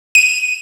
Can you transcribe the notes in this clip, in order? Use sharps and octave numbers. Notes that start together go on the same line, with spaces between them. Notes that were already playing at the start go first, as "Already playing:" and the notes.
D#7